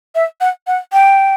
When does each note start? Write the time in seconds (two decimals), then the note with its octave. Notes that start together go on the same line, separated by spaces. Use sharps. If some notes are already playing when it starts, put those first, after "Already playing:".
0.15 E5
0.41 F#5
0.67 F#5
0.93 G5